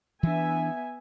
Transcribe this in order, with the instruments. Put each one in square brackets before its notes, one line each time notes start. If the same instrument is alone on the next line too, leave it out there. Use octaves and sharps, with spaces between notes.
[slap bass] E3 D4 [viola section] B3 E5 G#5